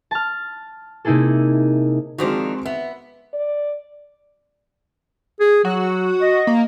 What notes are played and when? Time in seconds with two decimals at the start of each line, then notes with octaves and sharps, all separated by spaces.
0.11 A5 F6
1.05 C3 A#3 D#4 E4 G#4 A4
2.18 D#3 F3 G#3 C4 D4 F#4
2.66 B3 E5
3.33 D5
5.40 G#4
5.65 F#3 F#4
6.21 D#5
6.47 A#3